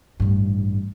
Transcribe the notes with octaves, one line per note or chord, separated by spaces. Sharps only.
A1 G2